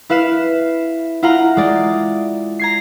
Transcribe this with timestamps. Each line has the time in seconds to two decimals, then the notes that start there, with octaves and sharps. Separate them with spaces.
0.10 E4 B4 F5 B6 E7
1.23 E4 F4 F5 F#5 A#5
1.57 G#3 D5
2.59 A#5 G#6 C7